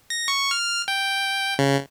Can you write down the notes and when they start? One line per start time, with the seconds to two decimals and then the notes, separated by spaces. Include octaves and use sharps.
0.10 A#6
0.28 C#6
0.51 F6
0.88 G5
1.59 C#3